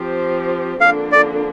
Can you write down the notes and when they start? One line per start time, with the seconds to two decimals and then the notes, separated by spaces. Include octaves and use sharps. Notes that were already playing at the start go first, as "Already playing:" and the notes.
Already playing: F3 C4 G4 C5
0.80 F2 D3 A#3 D4 F5
1.12 D5